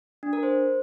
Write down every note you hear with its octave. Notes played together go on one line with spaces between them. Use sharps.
D4
A#4
C5